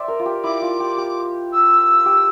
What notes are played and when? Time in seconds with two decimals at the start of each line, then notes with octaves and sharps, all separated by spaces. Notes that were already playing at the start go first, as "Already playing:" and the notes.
Already playing: C5 D5 E5 G5
0.08 A#4
0.19 F4
0.26 G4
0.43 E4 D6
0.62 F4
0.80 G4
0.98 G4
1.52 E6
2.06 G4